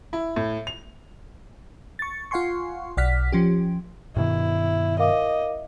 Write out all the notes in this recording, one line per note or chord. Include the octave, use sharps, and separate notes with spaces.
E4
A2
F7
C#6 A6
F4 F5 F#5 G#5 C6 C#6
B1 D5 F#5 F6 B6
F3 C#4 G4
G2 B2 D#3 E4
A#4 D#5 F5 D6